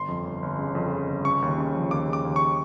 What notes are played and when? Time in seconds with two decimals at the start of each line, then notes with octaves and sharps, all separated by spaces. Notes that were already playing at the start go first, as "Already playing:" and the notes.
Already playing: G1 C6
0.08 F2
0.25 G1
0.43 G1
0.59 C#3
0.75 F2
0.93 C#3
1.08 G1
1.25 C#3 C#6
1.42 D#2
1.58 C#3
1.75 F3
1.91 D#2 D6
2.08 C#3
2.13 D6
2.25 D#2
2.36 C#6